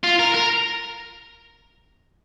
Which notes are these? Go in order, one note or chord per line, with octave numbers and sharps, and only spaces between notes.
F4
A#4
A#4